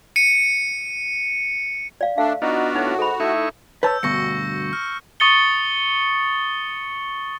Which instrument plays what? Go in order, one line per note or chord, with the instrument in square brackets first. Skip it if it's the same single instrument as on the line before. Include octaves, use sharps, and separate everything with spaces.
[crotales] C#7 D#7
[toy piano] D5 F5
[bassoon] A3 [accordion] D4 [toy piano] F5
[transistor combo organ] B3 D4 F4 [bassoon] D#4 [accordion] F#4
[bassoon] A2 [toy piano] D#4
[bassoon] G#2 [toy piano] A4 B5
[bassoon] A3 [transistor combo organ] D#4 E4 C#6
[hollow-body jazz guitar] B4 C#5 A5 [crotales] E6 G6
[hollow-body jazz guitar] D2 G2 B2 [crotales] C#6 A#6 C#7
[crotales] F6
C#6 D#6 A6 C#7 G7